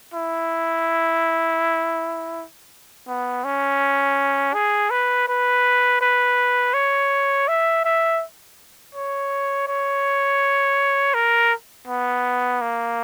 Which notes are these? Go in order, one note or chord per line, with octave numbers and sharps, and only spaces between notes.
E4
B3
C#4
G#4
B4
B4
B4
C#5
E5
E5
C#5
C#5
A#4
B3
A#3